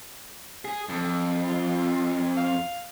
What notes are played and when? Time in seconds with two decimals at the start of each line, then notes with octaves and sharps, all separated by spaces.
0.65 G#4
0.89 F2
1.47 F4
2.37 F5